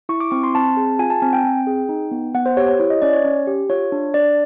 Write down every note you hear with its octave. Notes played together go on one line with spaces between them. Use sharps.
E4 C#6
D6
C4 C#6
C6
C4 A5
G#4
F4 G#5
A5
C4 G#5
G5
C4
G#4
D#4
B3
B3 F#5
C5
G4 C#5
C#5
E4 C#5
D#5
C#4 D5
C#5
C#4
G4
F4 C#5
D4
D4 D5